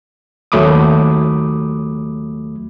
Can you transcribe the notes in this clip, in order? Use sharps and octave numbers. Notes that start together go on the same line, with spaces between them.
D#2 F#3 A3 B5 D6 D#6